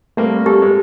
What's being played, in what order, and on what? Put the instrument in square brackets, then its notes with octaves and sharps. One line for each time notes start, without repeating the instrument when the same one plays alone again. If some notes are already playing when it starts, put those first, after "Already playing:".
[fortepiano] G3 A#3 C4 [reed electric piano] A3
[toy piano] G4 [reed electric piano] A4
[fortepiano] G#3